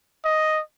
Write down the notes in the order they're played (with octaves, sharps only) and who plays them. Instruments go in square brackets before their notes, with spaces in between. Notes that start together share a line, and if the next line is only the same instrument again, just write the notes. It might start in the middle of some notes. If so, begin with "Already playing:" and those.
[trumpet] D#5